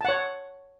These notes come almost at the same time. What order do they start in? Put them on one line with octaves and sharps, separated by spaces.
A5 F#5 C#5